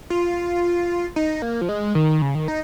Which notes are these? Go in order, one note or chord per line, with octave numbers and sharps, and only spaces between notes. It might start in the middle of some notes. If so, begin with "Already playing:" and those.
F4
D#4
A#3
F3
G#3
D#3
C#3
D#3
D#4